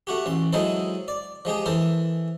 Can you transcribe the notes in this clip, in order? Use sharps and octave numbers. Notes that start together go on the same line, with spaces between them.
A3 F#4 G4
A1 C6
F#3 G#3 D#4 E4 A4 C5
D5
F3 G#3 G4 G#4
E3 A4 A#4 C5